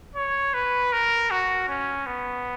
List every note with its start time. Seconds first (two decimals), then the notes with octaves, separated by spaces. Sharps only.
0.15 C#5
0.54 B4
0.93 A#4
1.31 F#4
1.69 C#4
2.06 B3